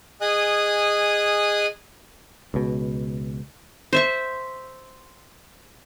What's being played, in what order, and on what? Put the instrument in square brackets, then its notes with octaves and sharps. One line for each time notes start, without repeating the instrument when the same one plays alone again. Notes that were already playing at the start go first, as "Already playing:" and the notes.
[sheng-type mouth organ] G#4 D#5 G#5 D#6 F#6
[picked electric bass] C#2 B2
[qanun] C5 E5 C#6